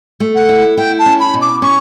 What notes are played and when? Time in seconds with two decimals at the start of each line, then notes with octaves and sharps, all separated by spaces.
0.20 A3
0.35 F#5
0.49 E4
0.77 E4 G5
0.98 A5
1.06 C#4
1.19 B5
1.34 B2
1.41 D6
1.62 C#4 C#6